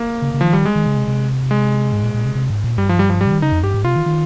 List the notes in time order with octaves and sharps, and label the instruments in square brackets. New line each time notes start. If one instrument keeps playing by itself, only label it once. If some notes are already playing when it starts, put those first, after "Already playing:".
Already playing: [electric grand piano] A#3
[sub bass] C#3
C#3
[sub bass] D#3 [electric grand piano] F3
[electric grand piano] G3
G#3
[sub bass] D#3
C#3
C3
C3
[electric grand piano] G#3
[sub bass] G#2
A#2
A#2
C3
C3
G#2
A#2
[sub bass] G2 [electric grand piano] G3
[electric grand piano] F3
G3
F3
[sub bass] G#2 [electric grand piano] G3
[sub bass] C#3
D#3
[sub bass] C#3 [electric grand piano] D#4
[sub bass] F2
[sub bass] G2 [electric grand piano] G4
[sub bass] G#2
[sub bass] C3 [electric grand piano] F4
[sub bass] D#3
D#3